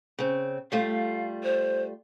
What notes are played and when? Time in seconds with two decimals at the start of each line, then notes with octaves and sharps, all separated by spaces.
0.19 C#3 C4
0.72 G3 A3 F4 F5
1.44 C5